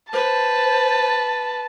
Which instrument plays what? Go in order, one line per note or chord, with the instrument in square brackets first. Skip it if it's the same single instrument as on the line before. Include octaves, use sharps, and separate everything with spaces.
[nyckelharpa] B4 [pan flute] C5 [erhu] A5